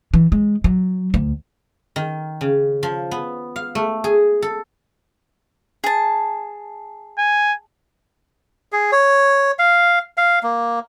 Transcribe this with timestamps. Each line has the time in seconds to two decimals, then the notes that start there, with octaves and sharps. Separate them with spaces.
0.14 E3
0.32 G#3
0.64 F#3
1.14 D2
1.96 D#3
2.41 C#3
2.83 F3
3.11 B3
3.56 F5
3.75 A3
4.04 G#4
4.42 A4
5.84 G#4 A5
7.18 G#5
8.72 G#4
8.92 C#5
9.59 F5
10.18 F5
10.43 A#3